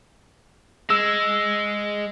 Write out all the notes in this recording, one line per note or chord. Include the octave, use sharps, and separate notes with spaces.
G#3 E6